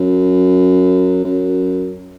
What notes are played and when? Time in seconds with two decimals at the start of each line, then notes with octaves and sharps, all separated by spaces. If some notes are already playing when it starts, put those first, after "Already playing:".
Already playing: F#2
1.24 F#2